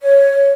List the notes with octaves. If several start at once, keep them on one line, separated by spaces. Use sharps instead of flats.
C#5